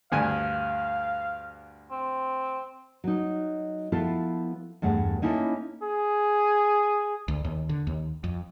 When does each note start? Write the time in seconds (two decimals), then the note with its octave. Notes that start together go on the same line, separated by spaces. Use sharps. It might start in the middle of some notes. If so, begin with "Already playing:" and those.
0.12 D2 G2 F5 G#5
1.91 C4
3.04 F#3 D#4
3.92 F3 B3 E4 F4 A4
4.82 E2 G2 A3 F#5
5.22 A#3 C#4 D#4 E4 G#4 A4
5.83 G#4
7.28 D2
7.45 D#2
7.69 D3
7.87 D#2
8.24 F2